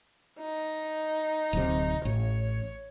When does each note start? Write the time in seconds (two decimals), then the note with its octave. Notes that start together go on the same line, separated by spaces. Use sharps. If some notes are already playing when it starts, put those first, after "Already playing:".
0.40 D#4
1.53 D1 C3
2.05 A1 C#5